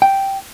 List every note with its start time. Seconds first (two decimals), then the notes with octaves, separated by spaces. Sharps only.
0.02 G5